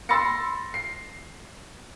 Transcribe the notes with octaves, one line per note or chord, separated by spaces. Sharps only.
B5 C6 E6 A6 A#6 C#7
C7